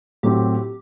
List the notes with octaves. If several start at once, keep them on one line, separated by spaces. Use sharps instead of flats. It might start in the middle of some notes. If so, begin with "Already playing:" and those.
A2 F#3 C4 F#4 G4